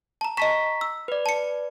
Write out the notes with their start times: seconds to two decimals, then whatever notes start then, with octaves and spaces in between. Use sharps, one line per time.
0.21 A5 A#5
0.37 D#5 A5 A#5 C#6 B6 E7
0.81 E6
1.08 B4 D5
1.26 A5 C#7